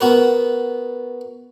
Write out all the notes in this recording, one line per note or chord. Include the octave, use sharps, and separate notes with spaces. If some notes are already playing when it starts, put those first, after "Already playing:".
B3 F#4 A#4